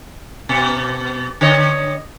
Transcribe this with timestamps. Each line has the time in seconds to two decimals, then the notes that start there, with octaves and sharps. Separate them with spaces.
0.49 B2
1.41 D3 C#5 D#5